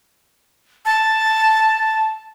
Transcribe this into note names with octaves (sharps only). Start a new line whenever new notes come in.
A5